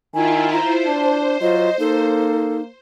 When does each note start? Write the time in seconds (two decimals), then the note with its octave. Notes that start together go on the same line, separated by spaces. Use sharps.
0.14 D#3 E4 F4 G#5
0.53 C5 A#5
0.85 D4 A5
1.41 F#3 F4 D#5
1.79 A#3 D#4 A4